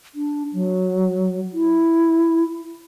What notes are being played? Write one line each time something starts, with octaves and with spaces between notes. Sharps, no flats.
D4
F#3
E4